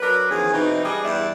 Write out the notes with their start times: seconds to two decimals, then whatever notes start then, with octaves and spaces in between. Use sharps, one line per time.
0.01 F#3 D4 A#4 B4
0.30 E2 D#3 F3 C#4 G#4
0.53 B2 E3 C4 D#4
0.84 G3 D4 G#4 D#5
1.03 E2 G2 G3 D5 E5